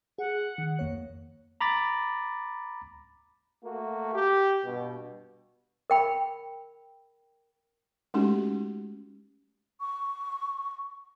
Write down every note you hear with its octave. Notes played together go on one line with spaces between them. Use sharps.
G#4 F#5
D#3
F2 A#3 C#5
A#5 B5 D6 A6 A#6
A3 A#3 F#4
G4
G2 B2
A#4 G5 B5
G#3 A3 C#4 D#4 F#4 G4
C#6